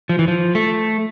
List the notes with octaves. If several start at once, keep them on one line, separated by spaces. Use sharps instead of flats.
F3
E3
F3
A3